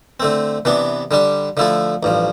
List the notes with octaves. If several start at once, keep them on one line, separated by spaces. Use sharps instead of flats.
D3 A3 C4
C3 E3 B3 D4
D3 G3 D4
D3 F3 A3 E4 A4
A1 G2 F3